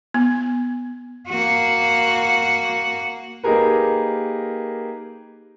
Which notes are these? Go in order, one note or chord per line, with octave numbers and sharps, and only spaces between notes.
B3
A#3 F#4
A#3 D#4 G4 G#4 A#4 B4